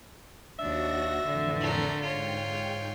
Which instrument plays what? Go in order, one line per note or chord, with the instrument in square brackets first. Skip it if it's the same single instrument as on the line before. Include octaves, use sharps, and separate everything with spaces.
[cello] D#2 D4 [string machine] F#4 A#6 [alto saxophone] E5
[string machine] F2 A2 E3 [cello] D3
[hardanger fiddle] A3 A#4
[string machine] G#2 G5 [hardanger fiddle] F4 C#5